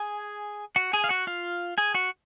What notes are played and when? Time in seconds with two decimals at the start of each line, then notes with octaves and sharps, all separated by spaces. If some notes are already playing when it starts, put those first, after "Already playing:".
Already playing: G#4 G#5
0.76 F#4 F#5
0.93 G#4 G#5
1.04 F5
1.09 F#4 F#5
1.27 F4 F5
1.78 G#4 G#5
1.95 F#4 F#5